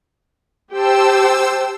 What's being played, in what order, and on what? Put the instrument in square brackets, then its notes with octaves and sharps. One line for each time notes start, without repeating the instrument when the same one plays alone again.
[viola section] G4 G5 A5 [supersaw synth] C5 E6